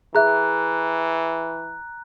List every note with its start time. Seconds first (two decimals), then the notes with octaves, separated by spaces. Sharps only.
0.15 E3 G#4 E5 A#5 F#6